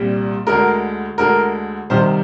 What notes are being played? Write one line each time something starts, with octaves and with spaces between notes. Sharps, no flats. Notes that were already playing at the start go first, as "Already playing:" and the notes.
Already playing: C2 A#2 G3
D2 D3 G#3 A#4
D2 D3 G#3 A#4
C2 C3 D#3 G3 C5